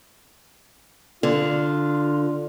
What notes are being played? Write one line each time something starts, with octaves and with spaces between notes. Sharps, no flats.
D3 F4